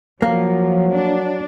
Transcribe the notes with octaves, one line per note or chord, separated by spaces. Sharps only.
F3 F#3 A#3
D4